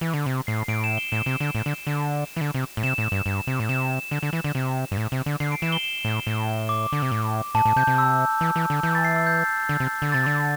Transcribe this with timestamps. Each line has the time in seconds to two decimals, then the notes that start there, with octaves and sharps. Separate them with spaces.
0.01 E3
0.14 D3
0.26 C3
0.47 A2 C7
0.68 A2 D7
0.84 E7
0.97 G7
1.12 A2 E7
1.26 C3
1.40 D3
1.55 A2
1.66 D3
1.87 D3
2.36 E3
2.41 D3
2.55 C3
2.77 A2
2.83 C3 E7
2.98 A2
3.12 G2
3.26 G2
3.47 C3
3.60 A2
3.69 C3 E7
4.11 D3
4.23 D3
4.33 E3
4.44 D3
4.55 C3
4.92 G2
4.98 A2
5.12 C3
5.26 D3
5.40 D3 C7
5.52 D7
5.62 E3 E7
5.72 G7
5.83 E7
6.05 A2
6.27 A2
6.69 D6
6.92 D3
7.02 C3
7.12 A2
7.55 A2 A5
7.65 A2
7.76 C3 G6
7.87 C3
7.98 E6
8.41 E3
8.56 E3
8.70 D3
8.83 E3 G6
8.95 A6
9.05 C7
9.16 E6
9.26 G6
9.69 D3
9.80 C3
10.02 D3
10.12 C3 A6
10.26 D3